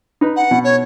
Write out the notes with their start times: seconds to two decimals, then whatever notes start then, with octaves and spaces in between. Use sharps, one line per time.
0.21 D#4 B4
0.36 F#5
0.51 B2
0.64 C#5